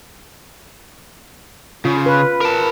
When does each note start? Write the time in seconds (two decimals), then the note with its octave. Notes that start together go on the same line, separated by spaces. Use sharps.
1.85 C#3 F4
2.06 B4
2.41 A#4 A5